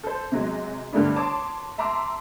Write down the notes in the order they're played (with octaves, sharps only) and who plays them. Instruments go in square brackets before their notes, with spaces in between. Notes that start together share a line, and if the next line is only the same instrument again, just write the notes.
[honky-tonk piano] A4 C5
C3 F#3 G#3
G2 D3 G3 A3 D4 E4
C#5 A5 C6 D6 D#6
E5 A5 A#5 C6 D6 E6